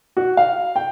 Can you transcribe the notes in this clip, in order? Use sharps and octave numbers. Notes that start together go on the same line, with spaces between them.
F#4
F5
G5